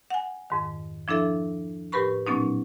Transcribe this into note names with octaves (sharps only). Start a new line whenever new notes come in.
F#5 G#5
F2 G#2 D#3
F3 D4 E4 A4 E5
A2 G4 A#4 B4 B5 C#6
A#2 F#3 B3 C#4 D#4